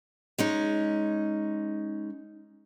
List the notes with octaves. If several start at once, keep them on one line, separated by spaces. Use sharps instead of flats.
G#3 C#4 D#4